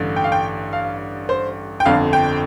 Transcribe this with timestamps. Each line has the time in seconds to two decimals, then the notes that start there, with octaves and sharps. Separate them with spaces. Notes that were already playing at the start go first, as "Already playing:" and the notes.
Already playing: A1 G2 D3
0.16 G5
0.24 F5
0.32 G5
0.73 F5
1.29 C5
1.80 G5
1.85 G1 F2 D3 F5
2.13 G5